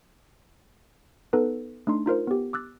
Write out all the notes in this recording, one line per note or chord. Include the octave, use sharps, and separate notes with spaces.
B3 D#4 A4 B4
A3 D4 D#4 C6
D#4 F4 A#4 C5
B3 G4
D6 E6 F#6 A6